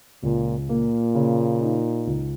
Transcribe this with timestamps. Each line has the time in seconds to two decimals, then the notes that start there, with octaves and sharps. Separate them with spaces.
0.23 C#2 A#2
0.69 A#2 A#3
1.15 C#3
1.61 D#4
2.07 C#2